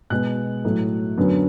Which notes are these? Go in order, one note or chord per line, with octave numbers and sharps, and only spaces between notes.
B2 G#3 B3 F#6
A2 F#3 A3
F#2 D3 F#3 B3